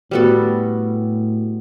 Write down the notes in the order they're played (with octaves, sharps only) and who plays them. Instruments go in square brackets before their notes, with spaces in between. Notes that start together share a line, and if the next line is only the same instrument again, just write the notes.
[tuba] A2 [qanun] G3 B3 F#4 A4